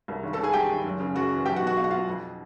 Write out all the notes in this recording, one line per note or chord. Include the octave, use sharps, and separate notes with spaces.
C2
G#1
A4 A5
G#1
G#4 G#5
G2 G4 G5
G#1
F#1
C#3
F#2 F#4 F#5
E3
B1 G4 G5
F#4 F#5
B2
F#4 F#5
B2 F5
F#5
B2 F4 F5
F2